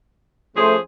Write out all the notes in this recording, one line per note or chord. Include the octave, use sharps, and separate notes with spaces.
F3 A3 C#4 G#4 C5